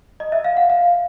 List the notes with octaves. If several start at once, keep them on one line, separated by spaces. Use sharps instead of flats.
D#5
E5
F5
F#5
F5